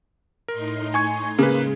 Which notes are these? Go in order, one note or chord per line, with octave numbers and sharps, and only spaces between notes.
A2 D#4 A#4 C6
G#5 C#6 G#6
C#3 G#3 A#3 G#4 B4